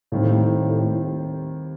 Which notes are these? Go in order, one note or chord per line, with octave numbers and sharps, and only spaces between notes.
D#2 A2 D#3 G3 C4